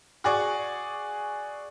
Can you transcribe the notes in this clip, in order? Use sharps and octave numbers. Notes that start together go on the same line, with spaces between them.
F#4 G#4 D5 C#6